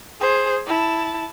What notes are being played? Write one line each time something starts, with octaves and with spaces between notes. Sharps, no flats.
G#4 C5
E4 A5